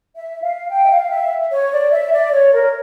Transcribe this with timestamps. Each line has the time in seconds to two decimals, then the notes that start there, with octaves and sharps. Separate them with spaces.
0.16 E5
0.43 F5
0.70 G5
0.84 E5
0.90 F5
1.10 E5
1.51 C#5
1.71 D5
1.92 E5
2.12 D5
2.32 C#5
2.53 A#4